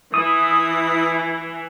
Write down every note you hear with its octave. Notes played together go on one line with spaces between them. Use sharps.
E3 E4 D#6